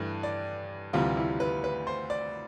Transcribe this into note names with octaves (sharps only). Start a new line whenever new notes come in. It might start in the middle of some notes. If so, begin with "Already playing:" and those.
Already playing: G2 E3 A3
D5
D2 C3 E3 G3 F4
E4
B4
B4
C5
D5